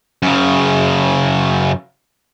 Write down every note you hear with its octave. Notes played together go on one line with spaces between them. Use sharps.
F#2 C#3